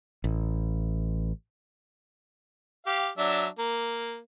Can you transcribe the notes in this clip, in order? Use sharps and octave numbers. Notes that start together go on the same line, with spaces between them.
A1
G4 F5
F#3 D4 E5
A#3